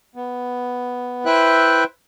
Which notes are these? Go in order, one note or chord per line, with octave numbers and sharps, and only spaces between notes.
B3
E4 B4 C5 E5 G5 F#6